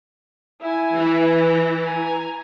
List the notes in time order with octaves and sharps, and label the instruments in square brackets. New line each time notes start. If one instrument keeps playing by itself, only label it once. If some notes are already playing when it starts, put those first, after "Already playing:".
[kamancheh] E4 G#5
[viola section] E3
[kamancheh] G#5 A#5